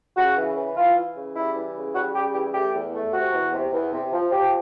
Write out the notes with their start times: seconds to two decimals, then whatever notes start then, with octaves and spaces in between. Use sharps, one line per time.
0.17 C#3 F#4
0.37 E3
0.57 E3
0.77 E3 F4
0.97 E3
1.16 C#3
1.36 G3 E4
1.56 E3
1.75 C#3
1.95 G3 F#4
2.15 C#3 G4
2.34 E3 G4
2.54 A3 G4
2.74 E2
2.94 A3
3.13 C3 F#4
3.33 E2
3.53 C3
3.73 E2
3.93 C3
4.13 F3
4.32 F3 G4